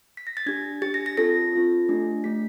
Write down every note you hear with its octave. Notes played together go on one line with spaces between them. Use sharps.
B6
A#6
A6
D4 G4 G#6
D4 G4 A6
A#6
A#6
C4 F4 A4 A#6
C4 F4 A4
A3 D4 G4
A3 D4 G4 B6